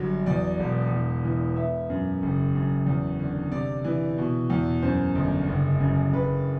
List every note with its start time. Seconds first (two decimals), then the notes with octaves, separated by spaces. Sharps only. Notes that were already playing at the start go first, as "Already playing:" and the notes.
Already playing: G1 F#3 G3
0.26 E2 D5
0.60 E1
0.91 E2
1.25 E3
1.56 B3 E5
1.90 F#2
2.22 F#1
2.55 F#2
2.86 E2
3.19 D3
3.52 C3 D5
3.84 E3
4.18 B2
4.50 E2
4.82 F#2 C5
5.15 G1
5.48 F#1
5.80 F#2
6.13 F#1 B4